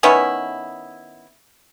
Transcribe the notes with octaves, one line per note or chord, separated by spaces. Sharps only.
D#3 B3 C#4 E4